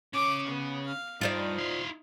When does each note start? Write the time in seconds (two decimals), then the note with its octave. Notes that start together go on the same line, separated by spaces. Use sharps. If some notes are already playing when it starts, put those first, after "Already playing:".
0.13 C#3 C#5 D6
0.46 B3
0.85 F5
1.21 G2 D#4 F4 C5 D5
1.58 E4 F5